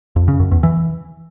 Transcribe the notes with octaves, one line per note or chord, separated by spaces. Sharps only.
F2
C#3
F#2
E2
E3